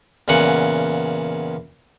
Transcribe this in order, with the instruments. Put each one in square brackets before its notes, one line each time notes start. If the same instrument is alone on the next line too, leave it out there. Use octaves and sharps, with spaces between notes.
[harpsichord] E2 A#2 C#3 F#5